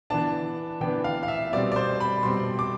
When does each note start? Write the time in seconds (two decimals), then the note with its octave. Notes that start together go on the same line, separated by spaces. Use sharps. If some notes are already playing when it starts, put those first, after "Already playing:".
0.10 E3 B3 D4 A5
0.81 E3 B3 D4 G5
1.04 F5
1.23 F5
1.28 E5
1.52 B2 G3 C4 D5
1.72 D5
1.76 C5
2.00 B5
2.23 B2 G3 C4 C6
2.59 D6